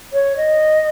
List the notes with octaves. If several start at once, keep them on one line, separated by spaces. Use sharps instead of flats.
C#5
D#5